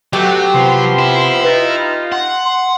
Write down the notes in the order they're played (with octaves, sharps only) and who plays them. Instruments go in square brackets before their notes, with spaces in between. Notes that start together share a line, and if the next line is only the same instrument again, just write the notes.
[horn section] B2 A3 F#4 [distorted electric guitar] F#3 [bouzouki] G4
[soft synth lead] C3 [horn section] F3 B3 C6
[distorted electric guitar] E4
[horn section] D#4 F4 [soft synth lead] B4
[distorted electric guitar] F#5 [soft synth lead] C6
[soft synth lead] C6